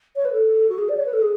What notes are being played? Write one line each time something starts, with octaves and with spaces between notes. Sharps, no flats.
C#5
B4
A4
F#4
G#4
D5
C#5
B4
A4
G#4